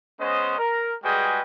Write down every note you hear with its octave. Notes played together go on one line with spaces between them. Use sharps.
G#3 B3 C#4 C5 D#5
A#4
G3 G#3 F#4 G#4 B4 G5